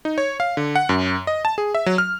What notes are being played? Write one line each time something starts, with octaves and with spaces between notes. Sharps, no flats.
D#4
C#5
F5
D3
F#5
F#2
D#5
A5
G#4
E5
F#3
F6